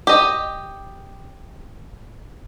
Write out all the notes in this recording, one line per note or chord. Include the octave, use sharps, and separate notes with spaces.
G4 D#5